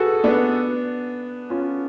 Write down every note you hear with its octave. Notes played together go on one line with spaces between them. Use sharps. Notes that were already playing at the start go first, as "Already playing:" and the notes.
Already playing: F#4 G#4 A4 B4
B3 D4
C#4 F4